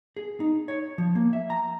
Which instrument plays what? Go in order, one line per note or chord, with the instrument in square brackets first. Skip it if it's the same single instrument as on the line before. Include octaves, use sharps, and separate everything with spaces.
[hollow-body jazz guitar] G#4
D#4
C#5
F3
A#3
E5
A#5